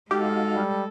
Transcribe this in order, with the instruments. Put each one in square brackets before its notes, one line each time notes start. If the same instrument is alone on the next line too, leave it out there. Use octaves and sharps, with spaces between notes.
[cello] G#3 A4 [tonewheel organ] D#4 F#4 F5 [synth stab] G4
[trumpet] G3